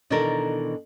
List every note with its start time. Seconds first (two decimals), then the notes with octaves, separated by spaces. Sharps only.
0.10 B2 D#3 E3 D4 A4 A#4